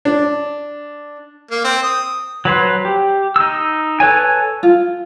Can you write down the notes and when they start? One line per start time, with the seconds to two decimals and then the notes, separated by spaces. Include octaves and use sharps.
0.05 D4
1.51 A#3
1.64 C4
1.83 D#6
2.45 F#3 B4 C5
2.85 G4
3.36 D#4 E6
4.00 A4 B4 C#5 G#5
4.63 F4